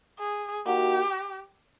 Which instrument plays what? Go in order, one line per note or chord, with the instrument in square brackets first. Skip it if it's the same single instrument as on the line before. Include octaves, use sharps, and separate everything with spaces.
[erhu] G#4
[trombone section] A#3 D#4 F#4 [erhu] G4